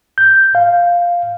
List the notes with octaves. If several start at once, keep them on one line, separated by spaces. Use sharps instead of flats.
G6
F5